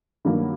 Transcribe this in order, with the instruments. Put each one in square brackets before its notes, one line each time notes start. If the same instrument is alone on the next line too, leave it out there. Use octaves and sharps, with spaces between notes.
[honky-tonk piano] G2 D#3 F#3 A#3